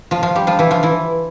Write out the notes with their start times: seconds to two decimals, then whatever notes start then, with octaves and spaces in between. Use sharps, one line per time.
0.11 F3 F4
0.23 F3 F4
0.35 G3 G4
0.47 F3 F4
0.59 E3 E4
0.71 F3 F4
0.83 E3 E4